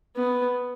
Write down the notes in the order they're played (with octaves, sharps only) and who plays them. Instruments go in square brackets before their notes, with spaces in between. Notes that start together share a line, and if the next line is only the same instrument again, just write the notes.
[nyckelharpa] B3